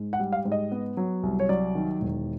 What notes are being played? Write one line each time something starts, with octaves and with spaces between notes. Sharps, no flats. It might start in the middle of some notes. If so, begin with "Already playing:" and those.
Already playing: G#2
F#5
G3
F5
G#2
D#5
B3
F#3
C2
C#5
F#3 D5
D#3
E1